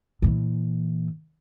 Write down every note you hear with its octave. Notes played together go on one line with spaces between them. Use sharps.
A#2 E3